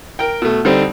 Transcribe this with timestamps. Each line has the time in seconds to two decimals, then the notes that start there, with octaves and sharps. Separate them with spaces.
0.19 A#4 G5
0.42 B2 A3
0.65 D3 G3 C4 D#4